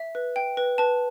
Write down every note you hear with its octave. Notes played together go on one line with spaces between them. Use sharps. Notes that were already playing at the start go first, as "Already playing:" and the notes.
Already playing: E5
B4
G5
B4
B4 A5